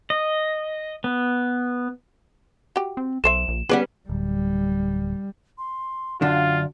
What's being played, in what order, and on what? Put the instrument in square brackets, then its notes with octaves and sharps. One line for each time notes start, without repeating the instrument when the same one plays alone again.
[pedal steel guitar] D#5
B3
[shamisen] F#4 G4
[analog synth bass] C4
[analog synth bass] B1 [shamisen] A4 C5 E5 [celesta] E7
[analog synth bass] A#1
[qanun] G3 C#4 B4 [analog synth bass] B3 [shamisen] G#4 D5 F#5
[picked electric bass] D1 [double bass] G3
[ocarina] C6
[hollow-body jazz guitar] F#2 D3 D4 [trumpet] F4 [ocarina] F5